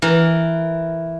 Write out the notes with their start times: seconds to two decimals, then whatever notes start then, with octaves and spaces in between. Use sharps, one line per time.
0.02 E3 A#4